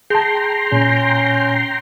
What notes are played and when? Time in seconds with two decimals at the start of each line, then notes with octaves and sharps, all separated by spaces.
0.10 G#4 G5 A5 A#5 C6
0.72 A#2 C#4